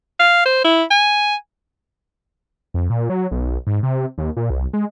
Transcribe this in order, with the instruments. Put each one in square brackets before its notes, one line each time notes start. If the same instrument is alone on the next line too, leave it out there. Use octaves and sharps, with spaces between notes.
[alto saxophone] F5
C5
E4
G#5
[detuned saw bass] F2
A#2
F#3
B1
G#2
C3
D#2
A#2
C2
G#3